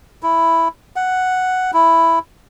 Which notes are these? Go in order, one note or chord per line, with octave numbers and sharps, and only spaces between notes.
E4
F#5
E4